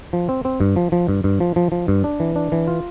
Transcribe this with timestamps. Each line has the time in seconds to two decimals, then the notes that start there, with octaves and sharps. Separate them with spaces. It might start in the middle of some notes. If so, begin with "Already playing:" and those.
0.13 F3
0.29 C4
0.45 C4
0.61 G2
0.76 F3
0.92 F3
1.09 G2
1.24 G2
1.40 F3
1.56 F3
1.72 F3
1.88 G2
2.04 D4
2.20 E3
2.36 D4
2.52 E3
2.67 F4